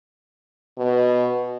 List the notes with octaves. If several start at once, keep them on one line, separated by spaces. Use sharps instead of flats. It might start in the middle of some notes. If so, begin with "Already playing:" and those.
B2